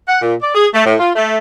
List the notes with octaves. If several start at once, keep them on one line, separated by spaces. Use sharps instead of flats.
F#5
A#2
D5
G#4
A3
A2
F4
A3